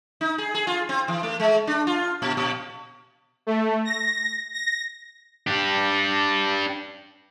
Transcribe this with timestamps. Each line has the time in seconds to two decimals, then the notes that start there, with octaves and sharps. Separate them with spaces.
0.21 D#4
0.38 G#4
0.55 G#4
0.67 F4
0.89 C4
1.08 E3
1.23 A3
1.40 G#3
1.67 D4
1.87 F4
2.22 A#2
2.37 A#2
3.47 A3
3.85 A#6
4.53 A#6
5.47 D4 G4